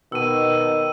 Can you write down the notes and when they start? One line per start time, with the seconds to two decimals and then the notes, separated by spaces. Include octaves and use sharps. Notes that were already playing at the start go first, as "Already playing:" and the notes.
0.12 B2 D#3 E6 D#7